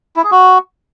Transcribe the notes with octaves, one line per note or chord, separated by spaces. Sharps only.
E4
G#4
F#4